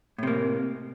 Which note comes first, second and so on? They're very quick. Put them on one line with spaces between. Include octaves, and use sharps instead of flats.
A2 C3 A#3